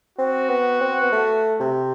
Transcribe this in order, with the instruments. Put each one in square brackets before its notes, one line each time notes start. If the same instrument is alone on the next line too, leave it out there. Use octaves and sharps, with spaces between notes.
[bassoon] C4 [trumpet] F#4
[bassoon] B3
C4
B3
A3
C3